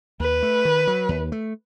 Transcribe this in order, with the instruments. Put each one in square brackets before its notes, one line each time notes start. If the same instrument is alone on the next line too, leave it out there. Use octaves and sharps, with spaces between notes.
[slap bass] D#2 [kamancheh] B4
[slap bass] A3
D#3
F#3
D#2
A3